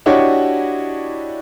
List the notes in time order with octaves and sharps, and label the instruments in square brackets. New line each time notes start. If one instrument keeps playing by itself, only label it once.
[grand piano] D4 E4 F#4 G4 C#5 D#5